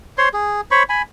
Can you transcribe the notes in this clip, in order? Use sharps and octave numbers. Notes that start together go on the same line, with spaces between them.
C5 C#5 C6
G#4
C5 C#5 B5 C#6
G#5 B5